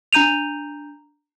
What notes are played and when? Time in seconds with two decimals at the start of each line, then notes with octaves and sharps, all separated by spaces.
0.13 D4 A#5 G6 D#7 F7